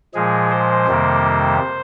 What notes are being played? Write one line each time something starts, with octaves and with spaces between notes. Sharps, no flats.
A#2 F3 G#3 G#4
C5
F2 C3 D#3 G3 A#3